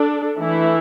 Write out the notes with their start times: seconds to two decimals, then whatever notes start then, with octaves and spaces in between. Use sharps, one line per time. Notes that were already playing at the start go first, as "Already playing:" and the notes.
Already playing: D4 A4
0.40 E3 A3 E4